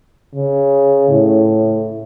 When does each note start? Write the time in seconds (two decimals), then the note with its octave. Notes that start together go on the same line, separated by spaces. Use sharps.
0.34 C#3
1.09 A2